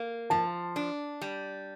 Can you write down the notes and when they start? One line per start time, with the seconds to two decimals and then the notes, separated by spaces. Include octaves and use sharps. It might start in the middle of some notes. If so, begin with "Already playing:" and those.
Already playing: A#3
0.30 F3 A5
0.76 D4
1.21 G3